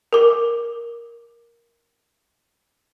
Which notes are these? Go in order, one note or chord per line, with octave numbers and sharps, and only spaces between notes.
A#4 D6